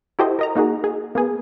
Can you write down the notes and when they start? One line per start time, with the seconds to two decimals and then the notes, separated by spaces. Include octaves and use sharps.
0.19 E4 F#4 G4 A4 C5 D#5
0.39 A#4 D#5 A#5
0.55 A#3 D#4 F#4 G#4
0.84 G#4
1.15 A#3 B3 G#4